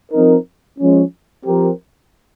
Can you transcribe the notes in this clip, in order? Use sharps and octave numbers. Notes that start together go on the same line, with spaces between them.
F3 C4 D#4 A#4
F3 G#3 C#4
F3 C4 G4 A#4